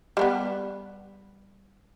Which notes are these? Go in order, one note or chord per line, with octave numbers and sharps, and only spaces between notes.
G3 A3 B3